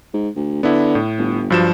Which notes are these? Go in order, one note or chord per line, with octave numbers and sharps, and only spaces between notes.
G#2
D2
D3 B3 E4
A2
G1
G2 F3 F#3 E7